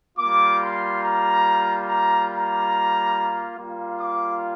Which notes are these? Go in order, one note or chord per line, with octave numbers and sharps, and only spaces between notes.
G3 A#3 F4 D6
C6
A#5
A#5
A#5
G3 A#3 F4
D6